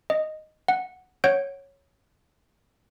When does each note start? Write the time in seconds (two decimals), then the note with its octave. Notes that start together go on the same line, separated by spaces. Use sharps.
0.10 D#5
0.68 F#5
1.24 C#5 F#5 G6 D7